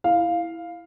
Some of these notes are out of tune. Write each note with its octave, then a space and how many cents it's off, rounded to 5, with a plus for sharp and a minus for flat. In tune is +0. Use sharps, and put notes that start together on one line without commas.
E4 +0 F5 +0